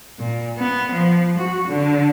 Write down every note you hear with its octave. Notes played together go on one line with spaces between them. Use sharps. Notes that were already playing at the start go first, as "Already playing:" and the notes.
A#2
B3
F3
F#4
D3